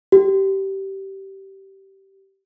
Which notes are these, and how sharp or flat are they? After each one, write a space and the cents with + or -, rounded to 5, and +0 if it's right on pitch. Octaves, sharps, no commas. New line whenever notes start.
G4 -20